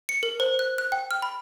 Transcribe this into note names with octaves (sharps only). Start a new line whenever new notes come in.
C#7
A#4
C5
F#6
F#6
G5
F6
B5